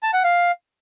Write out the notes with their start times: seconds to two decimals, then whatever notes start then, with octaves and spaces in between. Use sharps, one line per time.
0.03 A5
0.13 F#5
0.24 F5